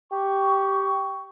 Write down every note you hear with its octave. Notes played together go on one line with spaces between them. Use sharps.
G4 C#6